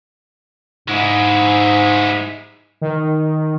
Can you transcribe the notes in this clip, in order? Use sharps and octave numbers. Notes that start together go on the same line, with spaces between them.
G#2 G#3 E4
D#3